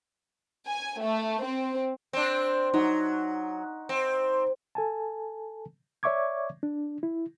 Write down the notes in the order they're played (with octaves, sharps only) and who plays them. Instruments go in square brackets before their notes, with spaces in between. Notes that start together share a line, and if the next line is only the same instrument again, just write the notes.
[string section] G#5
A3
C4
[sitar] C4 D4
[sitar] F#3 [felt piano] D#4
[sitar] C4
[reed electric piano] A4 G#5 A5
C#5 D5 E5 C#6 D6 G#6
D4
E4